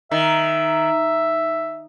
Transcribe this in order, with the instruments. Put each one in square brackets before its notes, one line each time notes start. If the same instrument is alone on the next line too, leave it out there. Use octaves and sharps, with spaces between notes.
[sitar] D#3 [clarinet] E5